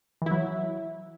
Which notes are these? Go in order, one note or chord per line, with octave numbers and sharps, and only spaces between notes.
E3 F#3 E4